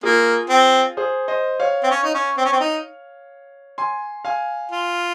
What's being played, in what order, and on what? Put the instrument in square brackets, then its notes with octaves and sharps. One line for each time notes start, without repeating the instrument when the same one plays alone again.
[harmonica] A#3 [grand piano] F4 G#4
[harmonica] C4
[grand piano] G#4 C5
C5 D#5
C#5 F5
[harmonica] C4
C#4
D#4
C#4
C4
C#4
C4
D#4
[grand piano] G#5 C6
F5 G#5
[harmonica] F4